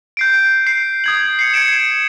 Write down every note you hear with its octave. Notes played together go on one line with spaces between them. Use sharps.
G6 C7 D7
C7
D#6 G#6 F#7
C7 C#7
G#6 C#7 D7 E7